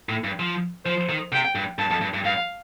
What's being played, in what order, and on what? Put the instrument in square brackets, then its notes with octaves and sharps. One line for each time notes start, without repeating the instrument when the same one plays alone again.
[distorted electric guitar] A2
G2
F3
[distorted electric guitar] F3 [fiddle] C5
[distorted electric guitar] D#3
[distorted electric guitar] C3 [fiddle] G5
[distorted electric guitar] G2
[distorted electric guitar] G2 [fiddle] A5
[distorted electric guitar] F2
G2
G2
[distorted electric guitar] G2 [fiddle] F5